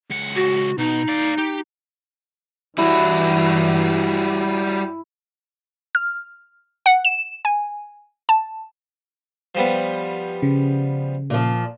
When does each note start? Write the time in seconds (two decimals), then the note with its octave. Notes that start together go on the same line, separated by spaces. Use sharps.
0.11 C#2 F#5
0.36 F#4
0.78 B2 D#4
1.08 D5 F5
1.38 G4
2.78 G2 E3 G3 E4 F#4
5.95 F6
6.86 F#5
7.05 E7
7.45 G#5
8.29 A5
9.55 F3 G3 B3
10.43 C#3
11.30 A#2 F3